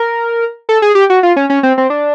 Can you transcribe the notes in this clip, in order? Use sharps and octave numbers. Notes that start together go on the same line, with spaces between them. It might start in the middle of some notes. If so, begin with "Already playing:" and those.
Already playing: A#4
A4
G#4
G4
F#4
F4
C#4
C#4
C4
C4
D4